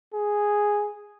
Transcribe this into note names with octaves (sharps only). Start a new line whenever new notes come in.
G#4